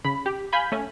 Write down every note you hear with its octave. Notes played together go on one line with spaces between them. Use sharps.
C#3 B5
G4
F5 G#5 B5 G6
A3 C#4